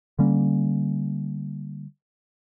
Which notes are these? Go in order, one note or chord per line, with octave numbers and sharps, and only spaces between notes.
D3 G3 A#3 C#4